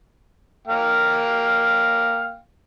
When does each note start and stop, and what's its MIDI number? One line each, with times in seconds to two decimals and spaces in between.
0.67 2.38 58
0.67 2.38 77
0.67 2.38 79